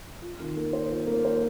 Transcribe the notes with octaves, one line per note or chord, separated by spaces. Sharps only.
F4
D#3
A#3
C5
F4
A#3
C5